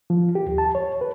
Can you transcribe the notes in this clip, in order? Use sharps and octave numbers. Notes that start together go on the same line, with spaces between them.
F3
G4
D#2
A5
C#5
B4